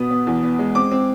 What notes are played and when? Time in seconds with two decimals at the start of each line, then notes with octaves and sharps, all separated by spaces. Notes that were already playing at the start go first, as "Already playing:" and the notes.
Already playing: B2 B3 D#6
0.10 B3
0.27 E2
0.43 B3
0.59 G#3
0.75 C4 D6
0.91 C4